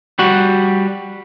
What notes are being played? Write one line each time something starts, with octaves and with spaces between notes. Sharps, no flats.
G3 F#4 F#5